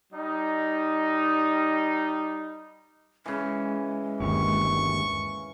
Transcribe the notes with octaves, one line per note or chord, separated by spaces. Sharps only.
G3 D#4
C#3 E3 G#3
G1 D#2 C#6